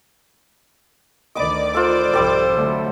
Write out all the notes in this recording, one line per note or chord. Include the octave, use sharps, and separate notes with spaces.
D2 D#3 D5 D#5 B5 D6
F4 A4 C5
C2 F2 G#2 G3 G4 A4
D3 F#3 A3